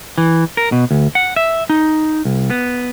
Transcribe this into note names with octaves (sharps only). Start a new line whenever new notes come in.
E3
A#4
B2
D2
F#5
E5
D#4
C2
B3